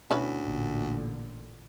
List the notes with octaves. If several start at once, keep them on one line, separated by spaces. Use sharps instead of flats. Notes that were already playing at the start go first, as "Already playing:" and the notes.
D2 B2 C#4 E4 B4
A1 A#2 D3